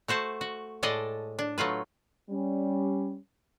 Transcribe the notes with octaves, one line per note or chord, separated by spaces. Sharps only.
A3 F#4 C5 A5
F#4
A2 G#3 A4 D5 D#5
D4
F#3 A3 F4 B4
G3 C#4